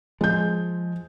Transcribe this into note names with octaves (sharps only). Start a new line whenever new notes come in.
F3 G#3 G6